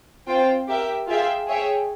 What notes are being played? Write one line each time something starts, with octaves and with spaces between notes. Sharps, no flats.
C4 F4 C5 G5
G4 A#4 E5
F4 G#4 E5 G5
G#4 C#5 E5 G5